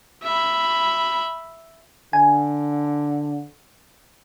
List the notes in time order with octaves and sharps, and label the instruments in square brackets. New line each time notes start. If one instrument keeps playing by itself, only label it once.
[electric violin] E5 B5
[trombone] D3 [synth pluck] G#5